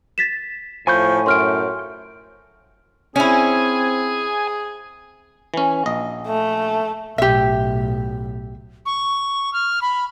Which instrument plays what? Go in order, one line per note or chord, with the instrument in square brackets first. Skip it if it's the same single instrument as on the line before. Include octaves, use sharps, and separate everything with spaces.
[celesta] A6 B6 E7
[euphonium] A2 [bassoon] F3 [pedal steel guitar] G#5 C#6 G6 [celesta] B5
[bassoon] F#2 [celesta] C6 F6 D7
[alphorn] C4 [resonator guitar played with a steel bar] C#4 E4 [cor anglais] G#4 [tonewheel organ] G#5
[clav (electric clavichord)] E3 C#4
A#1 D#5
[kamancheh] A3
[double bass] B1 A2 [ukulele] G4 E5
[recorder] C#6
F6
B5